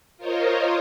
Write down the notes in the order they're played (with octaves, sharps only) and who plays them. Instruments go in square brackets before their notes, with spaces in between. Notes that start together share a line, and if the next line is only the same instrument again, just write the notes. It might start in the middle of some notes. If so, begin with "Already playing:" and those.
[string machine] F4 A#4 C5 C#5 D#5